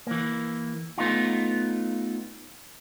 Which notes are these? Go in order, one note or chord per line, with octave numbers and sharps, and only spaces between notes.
E3 A#3
A3 B3 D#4 F4